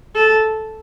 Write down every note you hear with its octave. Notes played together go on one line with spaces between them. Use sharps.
A4